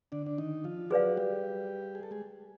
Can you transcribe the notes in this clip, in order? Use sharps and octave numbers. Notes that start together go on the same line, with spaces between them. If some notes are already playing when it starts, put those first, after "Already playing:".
D3 D4
D4
D#3 D#4
F3 F4
F#3 F#4 G#4 B4 D5 F5
G3 G4
G#4
A4
G#3 G#4